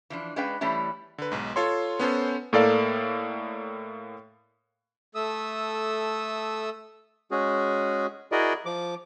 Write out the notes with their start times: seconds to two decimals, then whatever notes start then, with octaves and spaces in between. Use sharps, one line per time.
0.10 E3 F3 D4
0.36 G#3 C#4 D4 B4 F5 G5
0.61 E3 G3 A3 C#4 E4
1.18 D3 B4
1.32 B1 G#2
1.56 F4 A4 C#5 C6
1.99 B3 C#4 A4 C5
2.53 A2 A#3 A4 D5 F5
5.15 A3 A4 E5 D#6 E6
7.31 G#3 C#4 F#4 G#4
8.32 E4 F#4 G#4 A#4 D5 D#5
8.66 F3 D6